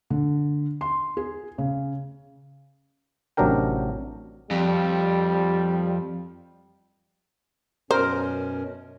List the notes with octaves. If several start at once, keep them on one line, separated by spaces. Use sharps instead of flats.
D3
C6
G#4
C#3
A1 C3 F#3 D4 A#4 G5
F2 G3
F#2 B2 C#4 A#4 C5